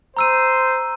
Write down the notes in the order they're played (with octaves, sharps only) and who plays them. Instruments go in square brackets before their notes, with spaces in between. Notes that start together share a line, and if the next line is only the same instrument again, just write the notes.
[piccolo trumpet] C5 [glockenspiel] A#5 E6 D#7